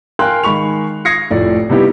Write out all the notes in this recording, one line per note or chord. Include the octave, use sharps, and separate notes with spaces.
A#4 F5 G5 G#5 C6 F#6
D#3 G#3 B5 C#6 F7
D#6 G#6 A#6 C7 C#7
F1 A2 F3 D5
C3 G3 B3 D#4 E4 G4